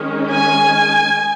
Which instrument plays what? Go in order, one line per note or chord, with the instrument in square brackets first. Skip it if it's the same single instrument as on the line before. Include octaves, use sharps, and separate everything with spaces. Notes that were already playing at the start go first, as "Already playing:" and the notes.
Already playing: [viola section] D#3 G#3 C#4
G#5